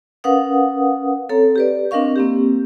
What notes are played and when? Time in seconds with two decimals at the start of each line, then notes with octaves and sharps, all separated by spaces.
0.24 C#4 A#4 B4 F5 F#5 D#6
1.29 C4 A4 C#5 A#5
1.56 G4 B4 D5
1.91 C4 D4 A#4 D#5 F5 C#6
2.16 A#3 C4 G4